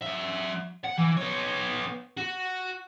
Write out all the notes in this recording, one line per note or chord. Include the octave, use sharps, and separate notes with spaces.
F#3 E5
F#5
E3
B3 C#5
F#4